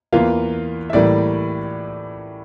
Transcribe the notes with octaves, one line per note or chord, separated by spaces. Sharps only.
E2 E3 A#3 F4 F5
E5
A2 E3 G3 A#3 D5